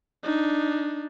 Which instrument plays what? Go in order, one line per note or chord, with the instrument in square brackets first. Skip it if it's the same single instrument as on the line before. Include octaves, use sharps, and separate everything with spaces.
[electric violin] D4 D#4